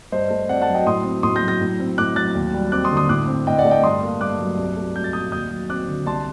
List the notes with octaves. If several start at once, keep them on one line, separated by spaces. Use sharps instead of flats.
G2 C5 D#5
A3
C4 D5 F#5
F#5 A5
F#3
D#5 G5
A2 C6 D#6
C4
A2 C6 D#6
G6 A#6
F#3
G6 A#6
A2
C4
A2 D6 F#6
F#3 F#6 A6
D#2
G3
C4 D6 F#6
C6 D#6
D3
C6 D#6
A2 D6 F#6
C4
A2 D#5 G5
D5 F#5
A3
D#5 G5
G2 C6 D#6
A#3
G2 D6 F#6
F#3
C2
A3
C2 G6
A6
A#2 D#6 G6
D#2 D#6 G6
F#3
C4 D6 F#6
D3
C2 A5 C6